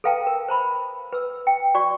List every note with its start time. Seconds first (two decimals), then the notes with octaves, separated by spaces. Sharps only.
0.04 A4 B4 F5 G5 A5
0.27 A#4
0.48 C5 A5 B5
1.13 B4 E6
1.47 G5
1.75 F#4 D5 C#6